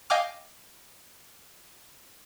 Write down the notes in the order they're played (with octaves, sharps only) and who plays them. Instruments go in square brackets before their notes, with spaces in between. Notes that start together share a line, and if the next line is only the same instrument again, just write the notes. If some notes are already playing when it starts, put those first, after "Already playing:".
[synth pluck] D#5 F5 G5 G#5 D6 F6